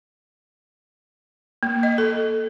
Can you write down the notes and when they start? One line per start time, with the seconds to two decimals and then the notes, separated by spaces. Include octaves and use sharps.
1.63 A#3
1.83 D#5
1.98 A4